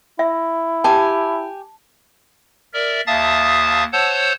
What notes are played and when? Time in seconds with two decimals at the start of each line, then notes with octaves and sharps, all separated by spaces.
0.19 E4 E5
0.84 G4 G#5 A5
2.73 A#4 D5 E5
3.07 D#2 E5 F5 A5 D#6 A6
3.93 C5 C#5 F#5 A5 E6 G6